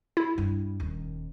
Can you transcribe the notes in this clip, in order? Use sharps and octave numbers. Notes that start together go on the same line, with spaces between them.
E4
G2
D#1 D#2